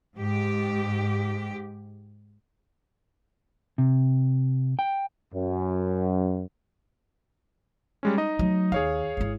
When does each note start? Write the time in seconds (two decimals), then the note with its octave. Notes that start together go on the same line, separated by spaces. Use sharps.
0.16 G#2 G4
3.78 C3
4.79 G5
5.33 F#2
8.03 G3 G#3 C#4
8.17 D#4 D#5
8.39 F#3 A3
8.72 D#2 G#4 C#5 F5
9.17 G#1 E4